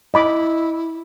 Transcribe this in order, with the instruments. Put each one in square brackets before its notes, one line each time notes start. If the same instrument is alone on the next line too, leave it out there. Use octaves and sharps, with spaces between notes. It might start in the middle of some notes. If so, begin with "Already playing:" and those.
[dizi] E4 [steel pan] D#5 B5 D6